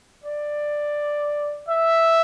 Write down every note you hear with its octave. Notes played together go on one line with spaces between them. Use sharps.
D5
E5